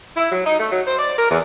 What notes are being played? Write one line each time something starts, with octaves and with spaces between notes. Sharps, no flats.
E4
F#3
D#4
A3
F#3
C5
D5
A#4
E2